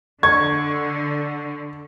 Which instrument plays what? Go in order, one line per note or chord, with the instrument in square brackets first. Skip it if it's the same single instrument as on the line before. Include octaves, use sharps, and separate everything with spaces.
[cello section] D3 [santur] C#6 [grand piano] G#6